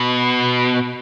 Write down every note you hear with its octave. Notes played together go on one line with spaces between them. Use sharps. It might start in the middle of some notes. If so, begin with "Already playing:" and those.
Already playing: B2